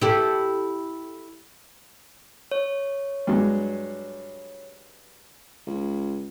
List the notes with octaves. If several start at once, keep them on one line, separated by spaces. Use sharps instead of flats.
E4 G4 A4
C#5
G2 F#3 G#3
C#2